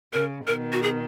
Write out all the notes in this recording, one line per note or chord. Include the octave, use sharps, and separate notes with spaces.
C#3 A#4
B2 D#3 A#4
F#4
G#4